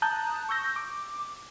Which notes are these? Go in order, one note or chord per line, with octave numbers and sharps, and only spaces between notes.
A5 A#5 D#6 F#6 G6
C#6 E6 G6 A#6
D6